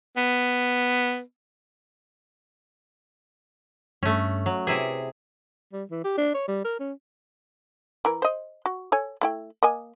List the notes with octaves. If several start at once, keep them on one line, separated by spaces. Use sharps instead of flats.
B3
G2 A3 C#4
F#3
C3 E4 G#4 B4
G3
E3
G4
D4
C#5
G3
A#4
C#4
E3 A#4
C5 D#5
F#4
A4 C#5 G#5
A3 E4 G5
A#3 D#5 G#5